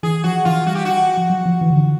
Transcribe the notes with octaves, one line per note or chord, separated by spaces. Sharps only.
E3 G#4
F3 F#4
E3 F4
G3 F#4
G4
F#4
F3
F#3
F3
E3
D3
D#3